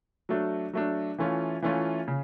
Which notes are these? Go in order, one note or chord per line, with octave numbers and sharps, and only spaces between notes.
F#3 A3 D4
F#3 A3 D4
E3 A3 C#4 F4
E3 A3 C#4 F4
C#3